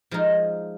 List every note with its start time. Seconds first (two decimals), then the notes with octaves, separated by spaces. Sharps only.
0.11 F3 G#3 D#4 A#4